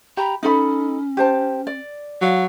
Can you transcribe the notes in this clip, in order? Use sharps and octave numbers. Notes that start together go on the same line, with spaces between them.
G4 A#5 B5
C#4 D#4 A4 B5
G4 C5 A5
D5
F#3 F5